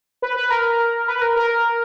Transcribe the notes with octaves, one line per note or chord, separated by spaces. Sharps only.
B4
B4
A#4
B4
A#4
A#4